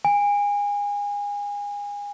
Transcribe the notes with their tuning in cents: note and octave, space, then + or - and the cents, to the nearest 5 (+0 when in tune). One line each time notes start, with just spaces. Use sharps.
G#5 -30